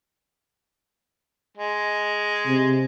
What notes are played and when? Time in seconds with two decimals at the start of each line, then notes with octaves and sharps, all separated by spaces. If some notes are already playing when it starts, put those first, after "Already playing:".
1.58 G#3
2.47 C3